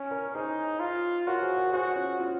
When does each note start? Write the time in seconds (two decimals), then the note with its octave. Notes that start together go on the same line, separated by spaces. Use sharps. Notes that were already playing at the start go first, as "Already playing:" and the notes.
Already playing: C#4
0.11 A#4 C#5
0.35 D#4 G#4 C5
0.80 F4
1.27 F#4 A#4 C#5
1.42 G#4 C5
1.58 A#4 C#5
1.73 F#4 G#4 C5
1.96 C#4 F4
2.20 C#4 F4